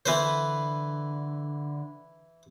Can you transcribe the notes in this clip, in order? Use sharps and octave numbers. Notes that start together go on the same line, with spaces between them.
D3 E3 B4 C5